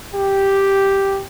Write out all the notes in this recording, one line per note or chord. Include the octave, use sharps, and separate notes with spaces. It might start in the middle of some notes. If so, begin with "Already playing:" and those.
G4